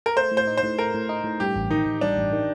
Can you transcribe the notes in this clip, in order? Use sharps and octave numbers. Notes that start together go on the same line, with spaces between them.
A#4
A3 C5
A2
C5
D#4
C5
A2
A3 A#4
A2
D#4
A2
G2 G4
A1
D#3 D#4
A1
G2 D4
A1
D#3